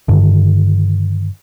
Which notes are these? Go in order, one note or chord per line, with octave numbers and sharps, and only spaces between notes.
G2 D3 D#3